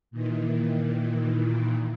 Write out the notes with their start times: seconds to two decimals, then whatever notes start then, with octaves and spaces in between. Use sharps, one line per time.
0.11 A#2 D#3 E3